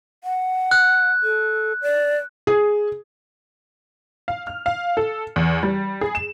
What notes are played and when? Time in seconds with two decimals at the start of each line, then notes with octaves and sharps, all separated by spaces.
0.24 F#5
0.71 F#6
1.23 A4
1.82 D5
2.47 G#4
4.28 F5
4.47 F6
4.66 F5
4.97 A4
5.36 E2
5.63 G3
6.01 G#4
6.15 E7